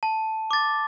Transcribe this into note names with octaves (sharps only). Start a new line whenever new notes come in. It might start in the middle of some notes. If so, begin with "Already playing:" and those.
A5
D6 A6